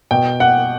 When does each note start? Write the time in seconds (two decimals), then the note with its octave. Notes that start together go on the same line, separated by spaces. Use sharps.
0.11 B2 G5
0.40 F#5